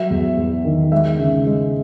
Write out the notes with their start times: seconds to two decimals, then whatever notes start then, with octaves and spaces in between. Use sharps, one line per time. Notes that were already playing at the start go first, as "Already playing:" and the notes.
Already playing: F#3 E5
0.10 E2
0.37 E2
0.65 D#3
0.92 G#3 E5
1.19 C#3
1.47 G#3